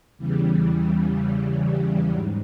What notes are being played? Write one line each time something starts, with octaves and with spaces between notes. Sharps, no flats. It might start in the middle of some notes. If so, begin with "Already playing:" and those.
E2 C#3 E3 G3
G3
G#2 F#3